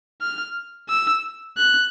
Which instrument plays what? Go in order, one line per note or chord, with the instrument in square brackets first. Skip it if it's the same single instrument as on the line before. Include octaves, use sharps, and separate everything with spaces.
[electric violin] F6
E6
F#6